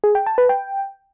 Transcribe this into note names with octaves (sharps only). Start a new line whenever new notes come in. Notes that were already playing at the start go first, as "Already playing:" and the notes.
G#4
G5
A5
B4
G5